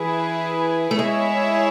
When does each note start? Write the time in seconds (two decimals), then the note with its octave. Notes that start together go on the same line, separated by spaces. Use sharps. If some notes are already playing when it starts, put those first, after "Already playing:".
Already playing: E3 E4 G#4 B4
0.91 A3
0.99 G#3 E4 G#4 C#5 E5